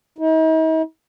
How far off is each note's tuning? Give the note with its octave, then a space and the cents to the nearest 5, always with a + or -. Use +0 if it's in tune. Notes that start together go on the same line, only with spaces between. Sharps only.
D#4 +45